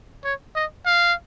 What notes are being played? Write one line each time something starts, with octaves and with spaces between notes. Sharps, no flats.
C#5
D#5
F5